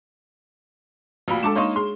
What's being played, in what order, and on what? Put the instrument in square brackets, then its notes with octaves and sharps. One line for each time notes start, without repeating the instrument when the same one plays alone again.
[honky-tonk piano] F1 A#2 B5 [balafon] F#4 F5
[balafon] G#3 D4 [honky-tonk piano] A4 D6 E7
[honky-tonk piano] A#3 D#4 [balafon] C#5 C6 C#6
[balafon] G#4 [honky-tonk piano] C6